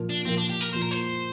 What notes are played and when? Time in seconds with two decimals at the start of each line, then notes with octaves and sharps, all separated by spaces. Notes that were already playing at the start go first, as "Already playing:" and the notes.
Already playing: A#2 F3 A#3
0.10 D4
0.25 A#2 F3 A#3 C4
0.37 D4
0.50 G4
0.61 A#4
0.73 A#2 F3 A#3 C5
0.82 A#4
0.91 C5